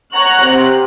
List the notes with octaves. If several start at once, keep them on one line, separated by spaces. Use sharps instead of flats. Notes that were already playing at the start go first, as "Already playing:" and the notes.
C#5 F#5 A#5 F#6
C3